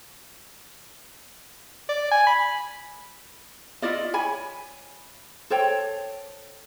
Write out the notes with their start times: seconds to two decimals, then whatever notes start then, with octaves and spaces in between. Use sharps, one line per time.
1.89 D5
2.12 G#5
2.27 B5
3.82 E4 F4 D5 D#5
4.14 C#5 G#5 B5
5.50 A4 C5 C#5 G5